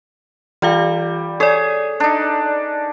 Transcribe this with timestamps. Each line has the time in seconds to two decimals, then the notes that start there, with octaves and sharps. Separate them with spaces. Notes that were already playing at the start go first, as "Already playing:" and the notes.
0.62 E3 G3 F4 F5
1.40 G#4 A4 C#5 D5
2.00 D4 D#4